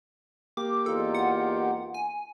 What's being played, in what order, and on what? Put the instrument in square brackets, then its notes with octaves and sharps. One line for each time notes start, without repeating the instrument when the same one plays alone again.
[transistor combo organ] A#3 G4 [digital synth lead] D6
[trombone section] E2 D#4 F4 [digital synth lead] A4
[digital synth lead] F#5
G#5